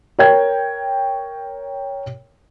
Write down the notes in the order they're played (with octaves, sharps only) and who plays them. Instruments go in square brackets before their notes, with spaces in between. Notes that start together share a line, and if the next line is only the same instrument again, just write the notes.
[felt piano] A#4 C#5 G5 G#6